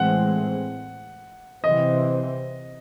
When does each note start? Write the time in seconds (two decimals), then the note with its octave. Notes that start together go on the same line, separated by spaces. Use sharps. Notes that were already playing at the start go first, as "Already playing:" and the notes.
Already playing: A2 E3 G#3 C4 F#5
1.64 C3 E3 C4 D#5